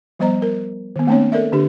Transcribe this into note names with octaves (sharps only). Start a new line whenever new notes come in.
F3 G3 B3 C5 D#5 A#5
A#4
D#3 B3
A3 A#3 C4 D4 C#5
A4 A#4 D5 E5
D3 D4 G4